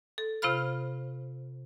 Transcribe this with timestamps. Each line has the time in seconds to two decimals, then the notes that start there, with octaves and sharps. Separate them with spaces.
0.18 A4
0.42 C3 F4 C5 F5 B5 F6